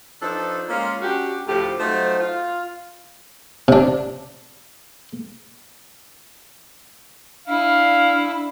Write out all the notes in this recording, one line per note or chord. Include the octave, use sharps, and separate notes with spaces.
F3 D4 D#4 A4 B4 C5
G#3 A#3 C#4 F4
C#4 D4 F#4 G4
D2 A2 F3 A3 G4
F#3 A3 D#4 F4 C5
F4
C3 D4
D4 E4 F5